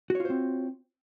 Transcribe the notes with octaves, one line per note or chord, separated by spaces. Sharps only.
C4 F4 F#4 C5 C#5